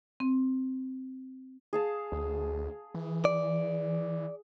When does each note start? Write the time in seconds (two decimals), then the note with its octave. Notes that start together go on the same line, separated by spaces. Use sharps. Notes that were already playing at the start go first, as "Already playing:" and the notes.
0.20 C4
1.73 G#4 F5 A5
2.12 D2
2.95 E3
3.25 D5